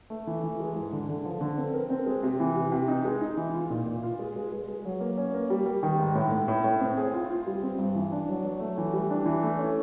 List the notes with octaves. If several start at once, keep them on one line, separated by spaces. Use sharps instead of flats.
A3
E3
E3
G#3
G#2
D3
D3
F3
D3
C4
A#4
C4
G#3
C3
E3
C3
C3
D#4
G#3
D#4
E3
F4
A#2
A#2
F4
G#3
G#3
G#3
G#3
F#3
A#3
C#4
A#3
G3
G3
D#3
G#2
A2
A2
A2
A2
C4
G#4
F4
F4
G3
C4
G2
E3
D4
F#3
F#3
A3
E3
G3
D4
E3
A3
C#4